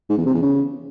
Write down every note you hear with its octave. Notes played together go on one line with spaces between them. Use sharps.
G#2
E2
C3
E2
C#3